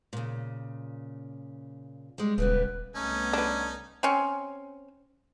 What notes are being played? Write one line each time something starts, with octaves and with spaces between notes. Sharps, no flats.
A#2 C#3
G3 G#3
D#1 C#3 G3 B3 B4
C2 A3 B3 C#4 D#4 A4
D4 B4
C4 C#4